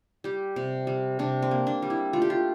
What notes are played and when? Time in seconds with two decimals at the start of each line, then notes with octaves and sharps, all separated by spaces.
0.24 G3 G4
0.56 C3
0.87 G3
1.19 C3 D4
1.42 C4
1.51 A#3
1.67 D4
1.82 G3
1.90 E4
2.13 A3 F4
2.22 G4
2.30 F4